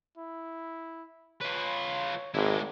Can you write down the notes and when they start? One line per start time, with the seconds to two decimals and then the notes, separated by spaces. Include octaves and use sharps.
0.18 E4
1.41 F4 B4 C#5
2.34 G#1 G#3 E4 D5